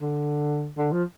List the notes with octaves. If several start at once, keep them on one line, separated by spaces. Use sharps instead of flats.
D3
D3
F3